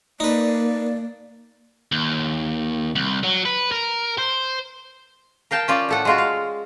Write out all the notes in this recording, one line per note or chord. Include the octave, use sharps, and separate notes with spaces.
A#3 D#4 B4 D5
D#2
C2
F#3
B4
A#4
C5
A#4 F5 G5 A5
C#4 F4 D5
A2 A4 F#5
G#3 F4 F#4
F5